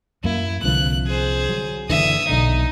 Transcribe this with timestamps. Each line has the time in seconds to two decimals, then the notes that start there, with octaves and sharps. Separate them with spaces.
0.24 F#2 A#3 E4
0.64 C2 D3 F3 F#6
1.07 G#4 C5
1.49 F#3
1.90 F#1 D3 E3 E5 D#6
2.29 B1 D3 D#4